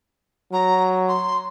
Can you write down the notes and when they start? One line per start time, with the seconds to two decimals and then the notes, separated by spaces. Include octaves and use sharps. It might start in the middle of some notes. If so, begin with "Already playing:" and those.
0.52 F#3 A#5
1.08 C6